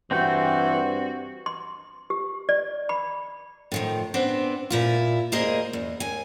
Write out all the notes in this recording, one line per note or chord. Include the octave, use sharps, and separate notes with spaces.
G2 E3 C4 F#4 G5 G6
C6
G4
D5
B5
A2 D#3 F3
B3 C4 D4
A#2 E4 F4
E2 A#3 G#4 C5 D#5
E2
D#2 G#5